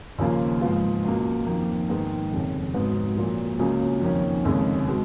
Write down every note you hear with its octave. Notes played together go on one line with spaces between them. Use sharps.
D#2 C#3 F3 A#3 F4
G#2 F3 B3 F4
C#2 B2 A#3
F2 D#3 A#3
G#2 D#3 G#3 B3
F1 D#2 C#3
G#1 G#2 F#3 B3
A#1 A#2 F#3 A#3
C#2 C#3 F#3 A#3 F4
F2 D#3 A#3 C#4
F1 D#2 C#3 G#3
B2 G#3